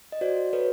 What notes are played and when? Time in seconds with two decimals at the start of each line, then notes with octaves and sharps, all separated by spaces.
0.12 D#5
0.21 F#4 C5 D5
0.53 A4 B4 C#5